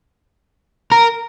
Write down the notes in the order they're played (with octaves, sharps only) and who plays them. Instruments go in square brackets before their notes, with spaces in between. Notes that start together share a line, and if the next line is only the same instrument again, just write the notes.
[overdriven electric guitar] A#4